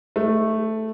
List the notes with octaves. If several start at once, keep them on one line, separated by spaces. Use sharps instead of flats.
A3